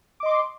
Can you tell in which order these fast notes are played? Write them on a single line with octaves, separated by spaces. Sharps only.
D6 D#5 C6